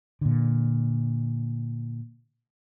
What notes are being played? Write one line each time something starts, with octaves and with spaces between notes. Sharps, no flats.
A#2 D3